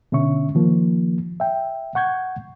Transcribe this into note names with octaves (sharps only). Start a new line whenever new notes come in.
B2 D3 C#4 E5 C#6
D#3 F3 A#3
E5 G5
F#5 C#6 G6 G#6